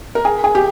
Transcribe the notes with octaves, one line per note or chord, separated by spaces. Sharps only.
A#4
G#4
G#4
G4